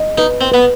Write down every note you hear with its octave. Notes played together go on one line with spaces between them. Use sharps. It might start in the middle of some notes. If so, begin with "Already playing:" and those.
Already playing: D#5
D#4 B4
C4
B3 B4